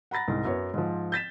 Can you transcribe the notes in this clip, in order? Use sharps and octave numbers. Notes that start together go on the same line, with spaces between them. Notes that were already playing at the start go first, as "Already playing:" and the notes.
F#5 A#5 B5 A6 A#6
C2 G#2
F#2 B3 C#5
G#2 F3
G6 A6 B6 E7